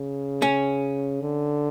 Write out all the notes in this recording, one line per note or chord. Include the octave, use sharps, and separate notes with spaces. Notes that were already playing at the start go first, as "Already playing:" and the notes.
Already playing: C#3
C#4
D3